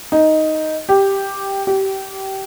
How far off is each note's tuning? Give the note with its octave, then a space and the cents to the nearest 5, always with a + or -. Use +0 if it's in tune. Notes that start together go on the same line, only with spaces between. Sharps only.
D#4 +5
G4 +0
G4 -25